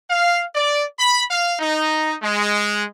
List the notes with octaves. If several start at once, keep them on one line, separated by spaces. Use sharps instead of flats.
F5
D5
B5
F5
D#4
G#3